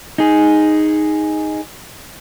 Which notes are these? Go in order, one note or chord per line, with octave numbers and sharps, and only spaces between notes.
D#4 G#4